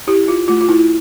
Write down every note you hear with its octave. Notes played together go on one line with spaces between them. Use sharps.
E4 G4
F4
A3 F4
F4
E4